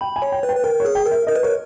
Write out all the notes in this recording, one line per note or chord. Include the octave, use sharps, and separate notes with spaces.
G5 B5
G#5
C#5
G5
B4
G5
B4
A#4 G5
C#5
G#4
G5
A#4
E5
A#4 D#5
B4
A#4 C#5